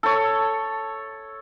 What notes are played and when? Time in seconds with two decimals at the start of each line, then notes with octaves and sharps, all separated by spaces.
0.03 A4 C#5